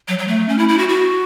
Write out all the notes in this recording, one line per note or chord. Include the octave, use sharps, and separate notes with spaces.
F#3
F#3
A3
C#4
E4
E4
F#4
F#4